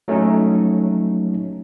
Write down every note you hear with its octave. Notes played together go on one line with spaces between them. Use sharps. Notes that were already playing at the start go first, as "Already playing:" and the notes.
F#3 A3 C#4 D#4